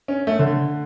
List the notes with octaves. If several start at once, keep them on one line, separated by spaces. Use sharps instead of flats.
C#4
A3
D3